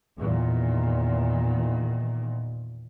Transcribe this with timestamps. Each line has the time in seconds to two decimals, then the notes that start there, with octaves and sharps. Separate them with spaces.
0.18 E2 A#2 D#3